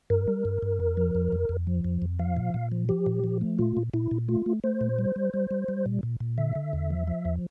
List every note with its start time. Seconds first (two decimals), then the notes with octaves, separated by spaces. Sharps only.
0.10 G2 A#4
0.28 G3
0.45 G2
0.62 G2
0.80 F2
0.97 F3
1.15 F2
1.32 F2
1.49 F2
1.67 F3
1.84 F2
2.02 F2
2.19 F3 F5
2.37 A#2
2.54 A#2
2.72 F3
2.89 F3 G4
3.06 A#2
3.24 F3
3.41 A3
3.59 A#2 F4
3.77 A#2
3.93 A#2 E4
4.11 A#2
4.28 A3 F4
4.46 A3
4.64 A3 C5
4.81 A#2
4.98 G3
5.16 G3
5.34 G3
5.51 G3
5.68 G3
5.86 A#2
6.03 A#2
6.20 A#2
6.38 D3 E5
6.55 D3
6.73 E2
6.90 F3
7.07 F3
7.25 E2